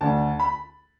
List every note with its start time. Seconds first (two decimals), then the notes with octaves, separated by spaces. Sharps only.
0.01 D2 D3 A5
0.40 B5